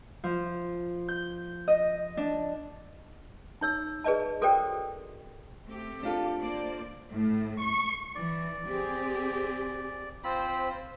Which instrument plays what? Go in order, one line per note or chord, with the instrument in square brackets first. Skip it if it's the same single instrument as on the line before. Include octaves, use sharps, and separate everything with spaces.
[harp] F3
G6
D#5
D4
[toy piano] D#4 C#5 E6
G#4 B4 D5 D#5 A5
F#4 A4 A#4 C5 D5 G5
[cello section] A3 C4 G4
[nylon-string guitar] D4 F4 A4
[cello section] A#3 C5 D5
[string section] A2
C#6
[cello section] E3 [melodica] D5
[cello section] C4 G4 G#4
[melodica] C4 F4 B5 [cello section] C5